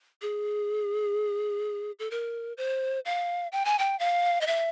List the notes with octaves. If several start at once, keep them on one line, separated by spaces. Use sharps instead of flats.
G#4
A4
A#4
C5
F5
G5
G#5
G5
F5
D#5
E5